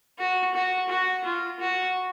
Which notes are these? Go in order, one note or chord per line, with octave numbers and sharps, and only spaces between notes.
F#4
F#4
F#4
F4
F#4